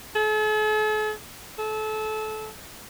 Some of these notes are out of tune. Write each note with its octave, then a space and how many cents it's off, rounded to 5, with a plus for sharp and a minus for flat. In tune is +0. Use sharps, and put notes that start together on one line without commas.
A4 -45
A4 -25